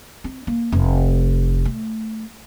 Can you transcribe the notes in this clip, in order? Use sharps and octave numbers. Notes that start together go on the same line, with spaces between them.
C4
A#3
F1
A3